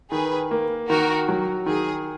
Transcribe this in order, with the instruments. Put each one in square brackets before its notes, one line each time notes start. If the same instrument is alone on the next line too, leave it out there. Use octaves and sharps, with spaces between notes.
[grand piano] D#3 [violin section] G#4 B4
[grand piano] A#3
[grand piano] D#3 [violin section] F#4 A#4
[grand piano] F#3
[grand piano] D#3 [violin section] G#4